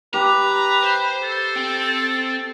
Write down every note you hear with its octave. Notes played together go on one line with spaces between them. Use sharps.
G4 B4 A#5
C5
A4
C4